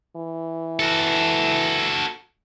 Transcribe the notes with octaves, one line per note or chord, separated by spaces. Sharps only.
E3
F#4 A4